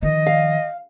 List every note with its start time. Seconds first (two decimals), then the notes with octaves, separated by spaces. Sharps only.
0.03 D#3 F3 D#5
0.26 F5